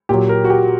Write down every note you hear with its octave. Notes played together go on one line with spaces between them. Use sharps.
A#2 F#3 G4
A#4
F#4
G4